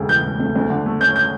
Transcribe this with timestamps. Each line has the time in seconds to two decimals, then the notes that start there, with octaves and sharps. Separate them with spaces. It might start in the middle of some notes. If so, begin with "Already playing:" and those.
Already playing: E1 D2 C#3
0.09 E3 G6
0.24 E1
0.40 D2
0.56 D2
0.70 D3
0.86 A3
1.00 C#4 G6
1.16 G6